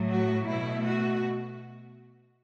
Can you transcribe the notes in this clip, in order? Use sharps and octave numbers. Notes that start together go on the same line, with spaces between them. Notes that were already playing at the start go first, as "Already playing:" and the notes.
Already playing: A2 F#3 A3
F#4
B2 A3 E4
F#4